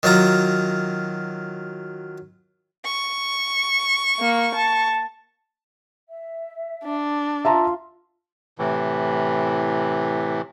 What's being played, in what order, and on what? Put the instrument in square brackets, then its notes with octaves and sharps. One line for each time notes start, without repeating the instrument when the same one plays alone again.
[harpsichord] D#3 F#3 F4 A#5
[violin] C#6
[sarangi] A#3
A5
[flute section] E5
[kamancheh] D4
[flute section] F4 F5 C6 [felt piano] E5 A5 A#5
[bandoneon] A2 C3 E3